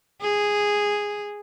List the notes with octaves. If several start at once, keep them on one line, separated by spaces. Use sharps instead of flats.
G#4